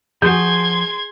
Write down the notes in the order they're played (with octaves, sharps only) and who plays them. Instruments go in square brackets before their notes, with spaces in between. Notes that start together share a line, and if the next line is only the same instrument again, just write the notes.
[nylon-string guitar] F3 F#4 [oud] G#4 [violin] C6 G#6 [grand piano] G6